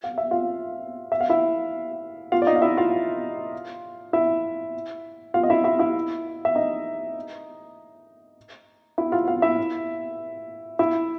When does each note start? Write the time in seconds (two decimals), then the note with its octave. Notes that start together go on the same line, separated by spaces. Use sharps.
0.04 F5
0.18 E5
0.31 F4 F5
1.12 E5
1.21 F5
1.30 E4 E5
2.32 F4 F5
2.42 D5
2.47 D#4 D#5
2.56 F5
2.62 E4 E5
2.77 F4 F5
4.13 E4 E5
5.34 F4 F5
5.43 D#5
5.50 E4 E5
5.64 E4 E5
5.79 E4 E5
6.45 E5
6.55 D#4 D#5
8.98 E4 E5
9.12 F4 F5
9.28 F4 F5
9.42 E4 E5
10.79 E4 E5